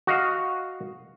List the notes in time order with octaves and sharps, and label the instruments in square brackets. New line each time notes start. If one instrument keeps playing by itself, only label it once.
[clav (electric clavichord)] F#4 D#5 F5